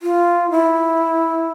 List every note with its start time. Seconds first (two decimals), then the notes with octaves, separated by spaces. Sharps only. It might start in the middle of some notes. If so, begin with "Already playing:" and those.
0.03 F4
0.51 E4